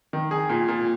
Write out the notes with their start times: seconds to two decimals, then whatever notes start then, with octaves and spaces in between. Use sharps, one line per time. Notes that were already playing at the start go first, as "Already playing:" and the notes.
0.13 D#3
0.31 G#4
0.49 A#2
0.68 A#2